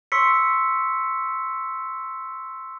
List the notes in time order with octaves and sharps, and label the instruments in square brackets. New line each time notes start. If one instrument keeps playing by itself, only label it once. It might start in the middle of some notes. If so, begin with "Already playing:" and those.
[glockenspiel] C6 C#6 E6 B6 C#7